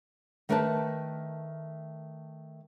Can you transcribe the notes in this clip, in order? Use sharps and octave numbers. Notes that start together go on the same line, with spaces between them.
D#3 A3 A#4 B4 G#5 A5